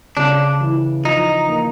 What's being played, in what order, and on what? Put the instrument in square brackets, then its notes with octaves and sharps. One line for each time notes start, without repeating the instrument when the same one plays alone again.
[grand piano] C#3 [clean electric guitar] D4
[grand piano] E3
[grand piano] F3 [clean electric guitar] D#4
[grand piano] A#3